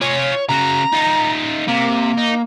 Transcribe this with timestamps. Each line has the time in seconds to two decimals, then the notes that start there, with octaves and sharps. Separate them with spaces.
0.02 F4 C#5 G#5
0.49 C#3 F#4 A#5
0.92 D#4 F4
1.68 C3 A#3
2.18 D#4